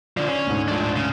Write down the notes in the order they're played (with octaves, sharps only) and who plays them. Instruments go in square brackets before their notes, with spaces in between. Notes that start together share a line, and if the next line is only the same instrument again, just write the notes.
[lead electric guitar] D3 F3 [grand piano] D5
[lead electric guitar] C#4
[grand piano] D2 G#2
[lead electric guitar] F3 D4
C#3